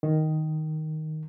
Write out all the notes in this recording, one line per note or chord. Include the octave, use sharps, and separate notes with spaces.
D#3